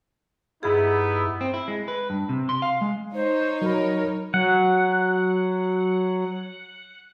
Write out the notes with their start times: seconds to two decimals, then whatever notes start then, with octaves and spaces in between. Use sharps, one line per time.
0.63 G2 B3 D#4 E4 G#4
1.41 C4
1.54 E4
1.68 G#3
1.88 B4
2.10 G2
2.29 C3
2.49 C6
2.62 F5
2.81 G#3
3.15 D#4 C5 C#5
3.62 F#3 A#4 B5
4.34 F#3 F#5